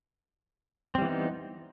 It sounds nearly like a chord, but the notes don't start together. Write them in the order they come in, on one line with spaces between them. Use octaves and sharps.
C4 G3 E3 B3 D#4